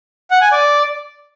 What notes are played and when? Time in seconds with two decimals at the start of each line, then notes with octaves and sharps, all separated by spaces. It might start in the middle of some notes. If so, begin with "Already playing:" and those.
0.31 F#5
0.41 G#5
0.52 D5